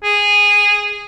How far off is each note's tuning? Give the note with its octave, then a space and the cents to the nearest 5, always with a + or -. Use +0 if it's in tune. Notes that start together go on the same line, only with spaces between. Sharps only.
G#4 -15